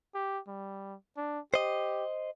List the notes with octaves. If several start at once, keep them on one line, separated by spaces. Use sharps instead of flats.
G4
G3
D4
G4 C5 D#5